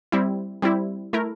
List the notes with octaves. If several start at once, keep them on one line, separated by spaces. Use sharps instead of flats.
G3 C4 E4
G3 C4 E4
A3 E4 A#4